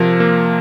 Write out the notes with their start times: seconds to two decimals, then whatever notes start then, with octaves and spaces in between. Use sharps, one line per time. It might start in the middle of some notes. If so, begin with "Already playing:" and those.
Already playing: C3 F3 A#4
0.20 A#3